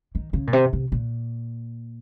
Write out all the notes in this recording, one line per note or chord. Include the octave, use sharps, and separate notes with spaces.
D#3
C#3
A#2
C3
C3
A#2